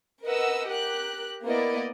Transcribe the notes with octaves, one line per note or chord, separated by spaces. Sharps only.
A#4 B4 D#5 F#5 E6
G4 A#4 F#6
A#3 B3 E4 A#4 D5 D#5